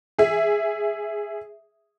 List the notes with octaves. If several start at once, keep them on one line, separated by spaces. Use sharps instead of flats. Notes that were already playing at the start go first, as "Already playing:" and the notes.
G#4 E5